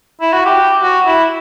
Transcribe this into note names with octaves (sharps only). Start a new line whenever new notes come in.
E4
F#4
G4
F#4
E4